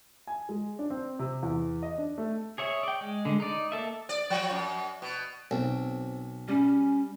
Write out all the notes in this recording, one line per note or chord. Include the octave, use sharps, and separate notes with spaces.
G#5
G#3
D4
C4
C3
E2
D#5
D4
A3
G#4 C#5 E5
D5 G5
G#3
D3 G#3
D#4 D5
A#3 A4 E5
D5
F3
F#2
B2
B1 C4
G3 C#4